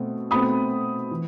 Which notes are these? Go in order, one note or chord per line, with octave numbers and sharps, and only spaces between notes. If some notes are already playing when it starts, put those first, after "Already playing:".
Already playing: B2 A3 C4
B2 A3 C4 B5 D#6
E3